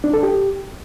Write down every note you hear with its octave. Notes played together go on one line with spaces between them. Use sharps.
D4
A4
G4